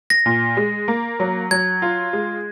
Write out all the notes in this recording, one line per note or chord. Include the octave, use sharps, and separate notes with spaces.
A#6
A#2
G#3
A#3
F#3
F#3 G#6
F4
G#3